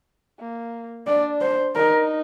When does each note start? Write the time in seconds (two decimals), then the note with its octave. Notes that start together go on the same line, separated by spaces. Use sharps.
0.39 A#3
1.07 D4 D5
1.41 C5
1.75 D#4 A#4